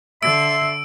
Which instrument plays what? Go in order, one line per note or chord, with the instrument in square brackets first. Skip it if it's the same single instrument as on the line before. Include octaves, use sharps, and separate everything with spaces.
[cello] D3 [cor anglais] E5 [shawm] C6 [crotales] E6 D7